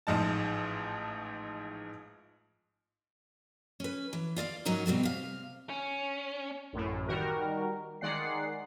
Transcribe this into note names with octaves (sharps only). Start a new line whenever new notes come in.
A1 G#2 F3 D#4 A5
C#4 B4
E3
F4 D5 D#5 F5
G#2 F#3 C#4 D#4 A#4
B2 G3 C4 F4
C3 F5
C#4
A1 F#2 A2
D#3 G3 F#4 A#4
D#3 G#3 D5 F#5 C7